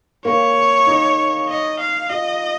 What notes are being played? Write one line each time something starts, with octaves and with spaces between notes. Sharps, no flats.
A#3 C#5
D#4
D#5
F5
F4 D#5